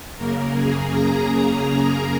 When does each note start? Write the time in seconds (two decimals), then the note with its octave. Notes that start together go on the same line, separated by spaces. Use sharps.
0.17 F#2 C#3 A#3 A#4
0.54 G#4
0.92 A#5